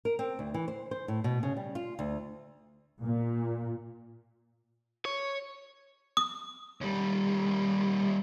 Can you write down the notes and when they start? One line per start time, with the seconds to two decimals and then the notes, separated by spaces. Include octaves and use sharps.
0.05 A#4
0.19 C4
0.39 D2
0.54 E3
0.68 C5
0.91 C5
1.08 A2
1.24 B2
1.43 C#3
1.57 G3
1.75 F4
1.99 D2
3.03 A#2
5.05 C#5
6.17 D#6
6.81 D#2 G3